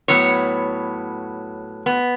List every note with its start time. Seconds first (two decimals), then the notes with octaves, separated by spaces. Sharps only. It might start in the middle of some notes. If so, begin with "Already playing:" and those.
0.08 A2 F#3 B3 C#5
1.86 B3